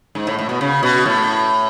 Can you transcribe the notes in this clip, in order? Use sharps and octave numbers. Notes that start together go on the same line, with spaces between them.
G#2
A2
A2
B2
C#3
B2
A2